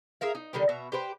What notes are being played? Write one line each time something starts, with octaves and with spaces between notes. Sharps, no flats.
G#4 A#4 E5 F5
D#4
D3 D#3 G3 G4
B2 E5 A#5
G4 B4 C5 G5